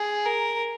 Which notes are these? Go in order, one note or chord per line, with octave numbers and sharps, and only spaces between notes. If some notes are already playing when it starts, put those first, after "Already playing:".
Already playing: G#4
A#4